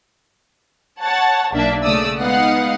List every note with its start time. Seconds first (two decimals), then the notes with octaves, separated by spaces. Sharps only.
1.02 C#5 F#5 A5
1.54 B1 A#3 D4 E5
1.84 C#3 A3 D5 D#6 E6
2.18 G#3 B3 D#4 F5 F#5